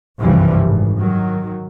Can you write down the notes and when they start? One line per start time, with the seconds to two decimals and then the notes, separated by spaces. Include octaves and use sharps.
0.20 F#1 C2 G2 E3 F3 G3
0.66 G#1
0.98 D#3 F#3